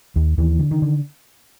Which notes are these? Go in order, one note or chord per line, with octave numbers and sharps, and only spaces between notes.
D#2
D#2 E3
D3
D#3
D3